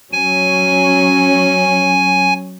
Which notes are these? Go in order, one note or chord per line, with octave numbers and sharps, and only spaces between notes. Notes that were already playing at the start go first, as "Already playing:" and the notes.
F#3 C#4 G#5